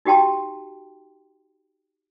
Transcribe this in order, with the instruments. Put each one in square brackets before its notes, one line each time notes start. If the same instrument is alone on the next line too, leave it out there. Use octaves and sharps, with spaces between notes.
[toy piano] D#4 F#4 G4 G5 A5 C6